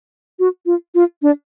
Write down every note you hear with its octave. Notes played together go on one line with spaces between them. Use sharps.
F#4
F4
F4
D4